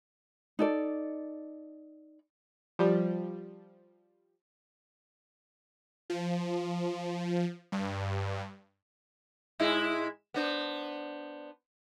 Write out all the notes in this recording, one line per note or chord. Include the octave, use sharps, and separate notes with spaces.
D#4 A4 D5
F3 G3
F3
G2
G#2 G#3 E4
B3 D4 C5